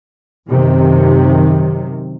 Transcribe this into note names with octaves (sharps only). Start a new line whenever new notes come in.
F#2 C3 D#3